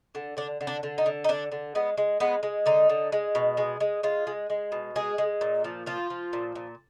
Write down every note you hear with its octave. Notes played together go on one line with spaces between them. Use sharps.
D3
D3 D4
D3
D4
D3
D#4
D3
D#4
D3 D4
D3
G#3 B3
G#3
G#3 B3
G#3
D3 D#4
D3
G#3
B2
G#3
G#3
G#3 F4
G#3
G#3
B2
G#3 G#4
G#3
A#2
F3
F3 F4
F3
A#2
A#2